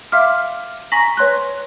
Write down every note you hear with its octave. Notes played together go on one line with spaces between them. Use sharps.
E5 F5 C6 D6 F6
G#5 A#5 C#6 A#6 B6 F#7
B4 C#5 C6 F#6